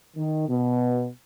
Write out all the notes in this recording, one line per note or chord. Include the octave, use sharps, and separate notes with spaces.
D#3
B2